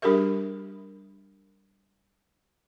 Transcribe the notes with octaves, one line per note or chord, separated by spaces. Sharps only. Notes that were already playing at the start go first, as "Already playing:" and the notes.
G3 D4 G4 G#4 A#4 E5